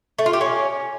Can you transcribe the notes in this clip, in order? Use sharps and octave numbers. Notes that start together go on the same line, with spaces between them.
A3
F4
G4
C#4